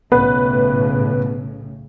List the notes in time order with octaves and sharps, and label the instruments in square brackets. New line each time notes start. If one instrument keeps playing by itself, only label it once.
[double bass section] B1 A2 C#3 [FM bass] B3 [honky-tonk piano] B4